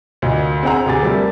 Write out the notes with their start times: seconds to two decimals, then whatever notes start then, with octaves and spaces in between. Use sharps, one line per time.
0.22 D2 A#2 D#5
0.63 C4 G#4 C5 F#5 A#5
0.86 D2 G4 G#4 D6 A6
1.02 G3 A3 C4 A#4